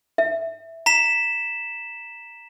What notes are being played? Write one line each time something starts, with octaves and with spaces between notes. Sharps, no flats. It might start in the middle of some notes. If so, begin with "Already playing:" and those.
E5
A#5 B6 E7